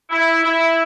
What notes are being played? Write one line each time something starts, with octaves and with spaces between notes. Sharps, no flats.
E4
E4